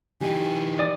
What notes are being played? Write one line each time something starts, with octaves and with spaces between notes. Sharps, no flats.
E3 D#4 G4 G#5
D5 D#6